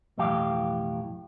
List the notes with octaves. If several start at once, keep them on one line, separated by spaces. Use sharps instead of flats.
B1 F2 A2 E3 G4 F5